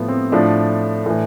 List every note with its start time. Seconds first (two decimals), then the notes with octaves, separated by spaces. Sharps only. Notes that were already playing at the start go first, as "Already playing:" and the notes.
Already playing: A2 F3 B3
0.08 C4
0.32 A2 F3 D4
1.06 A2 E3